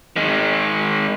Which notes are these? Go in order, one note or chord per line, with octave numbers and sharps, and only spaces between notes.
D#3 G#3